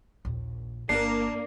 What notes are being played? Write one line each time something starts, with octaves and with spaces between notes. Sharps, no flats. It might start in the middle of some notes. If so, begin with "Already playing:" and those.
A#1 D#2
G1 A#3 D4 C7